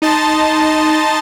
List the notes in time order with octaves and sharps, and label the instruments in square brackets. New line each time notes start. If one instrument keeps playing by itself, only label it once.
[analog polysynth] D#4 D#5 A5 C6 A6